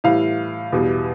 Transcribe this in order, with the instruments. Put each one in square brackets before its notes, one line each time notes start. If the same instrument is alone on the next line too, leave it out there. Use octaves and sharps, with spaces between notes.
[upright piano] A2 E3 G3 F5
E2 B2 G3